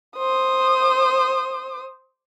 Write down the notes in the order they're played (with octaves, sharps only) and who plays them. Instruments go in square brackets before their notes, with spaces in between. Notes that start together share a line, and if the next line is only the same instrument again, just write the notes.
[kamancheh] C5 D#6